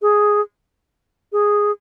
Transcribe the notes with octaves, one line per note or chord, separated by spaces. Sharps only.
G#4
G#4